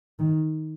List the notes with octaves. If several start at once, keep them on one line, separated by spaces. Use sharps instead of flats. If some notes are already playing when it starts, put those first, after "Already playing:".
D#3